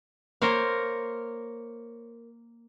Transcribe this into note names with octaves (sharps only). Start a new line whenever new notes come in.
A#3 A#4 C5 C#5 F5